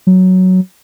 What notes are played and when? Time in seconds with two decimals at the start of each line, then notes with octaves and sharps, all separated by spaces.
0.07 F#3